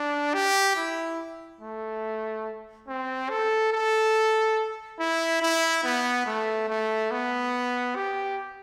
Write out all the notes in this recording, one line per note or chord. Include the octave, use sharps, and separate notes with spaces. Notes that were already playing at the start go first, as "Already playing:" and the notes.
Already playing: D4
G4
E4
A3
C4
A4
A4
E4
E4
B3
A3
A3
B3
G4